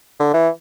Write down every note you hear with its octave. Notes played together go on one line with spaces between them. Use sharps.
D3
E3